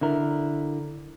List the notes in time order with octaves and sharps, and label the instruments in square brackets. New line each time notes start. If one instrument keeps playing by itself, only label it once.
[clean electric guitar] D3 E4 A#4